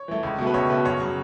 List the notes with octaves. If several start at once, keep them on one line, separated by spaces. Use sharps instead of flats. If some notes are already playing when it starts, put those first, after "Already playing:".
Already playing: C#5
E3 A3
C#2
B2 A3
B4
C#2 C#5
B2 A3 B4
F#2 C#5
C#3 F#3 C#6